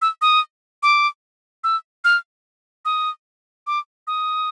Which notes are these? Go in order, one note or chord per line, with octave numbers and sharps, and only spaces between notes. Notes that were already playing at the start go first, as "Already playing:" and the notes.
E6
D#6
D6
E6
F6
D#6
D6
D#6